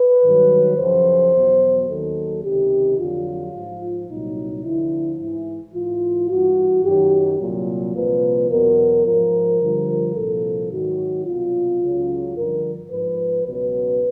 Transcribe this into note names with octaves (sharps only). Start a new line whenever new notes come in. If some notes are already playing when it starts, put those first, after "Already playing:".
Already playing: B4
G2 D#3 F#3
F#2 C#3 F3 C5
E2 B2 F#3
D#2 D#3 F#3 A4
C#2 C3 D#3 G4
F2 D3 F#3 F4
G#2 F3
C2 A#2 F#3 D#4
D2 D3 F3 E4
G#2 E3 E4
G#2 E3 F4
G2 E3 F#4
F#2 D#3 F#3 G4
C2 A#2 F#3
C2 A#2 F3 B4
E2 B2 F#3 A#4
G#2 F3 A#4
G2 D3 F3
C2 A#2 F3 A4
G#2 D#3 F#3 F#4
C2 B2 F#3 F4
C#2 C#3 F#3
G2 D3 F3 A#4
G#2 F3 B4
C#2 B2 F#3 B4